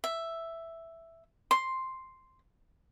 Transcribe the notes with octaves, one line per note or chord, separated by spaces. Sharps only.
E5
C6